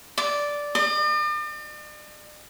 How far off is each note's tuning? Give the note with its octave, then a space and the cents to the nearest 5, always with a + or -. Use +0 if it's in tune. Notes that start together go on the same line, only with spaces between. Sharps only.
D5 -5
D5 +45